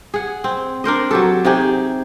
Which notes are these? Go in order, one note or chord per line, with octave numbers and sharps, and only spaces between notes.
G#4 F#5
C4
D4 A#4 C5 D#5
F#3 G4 A4
C3 D#4 G4 G#4